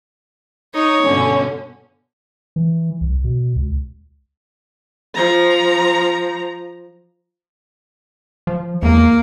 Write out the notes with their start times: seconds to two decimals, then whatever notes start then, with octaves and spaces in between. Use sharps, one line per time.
0.74 D#4 C#5
1.04 G2 B2 D3 C#4
2.56 E3
3.01 C2
3.24 B2
3.56 C#2
5.15 F3 A#5
8.47 F3
8.83 E2 A#3